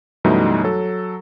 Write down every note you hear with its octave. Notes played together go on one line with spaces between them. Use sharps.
F#2 B2 E3 G3 A3 D#4
F#3 A4